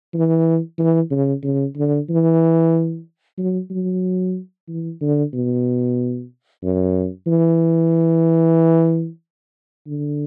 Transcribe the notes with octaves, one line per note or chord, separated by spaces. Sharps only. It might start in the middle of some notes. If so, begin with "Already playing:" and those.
E3
E3
C#3
C#3
D3
E3
F#3
F#3
E3
D3
B2
F#2
E3
D3